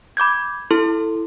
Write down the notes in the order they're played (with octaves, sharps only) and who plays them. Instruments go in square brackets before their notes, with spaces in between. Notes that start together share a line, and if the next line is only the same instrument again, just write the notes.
[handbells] B5 D6 G6 G#6
E4 A4 C6